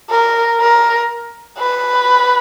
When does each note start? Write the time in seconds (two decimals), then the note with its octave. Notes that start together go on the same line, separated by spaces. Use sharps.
0.11 A#4
0.61 A#4
1.59 B4